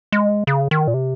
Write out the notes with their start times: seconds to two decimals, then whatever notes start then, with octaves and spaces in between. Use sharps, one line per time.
0.12 G#3
0.47 C#3
0.71 D#3
0.87 A#2
0.94 C3